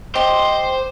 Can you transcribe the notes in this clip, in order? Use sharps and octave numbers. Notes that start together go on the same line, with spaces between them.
G4 C5 D#5 C6